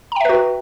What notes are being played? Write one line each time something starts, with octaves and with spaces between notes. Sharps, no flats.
F#4 B4 E5 G5 A#5